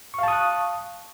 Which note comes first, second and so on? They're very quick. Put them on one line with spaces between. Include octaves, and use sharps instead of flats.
C#6 F5 A5 D#6 F#6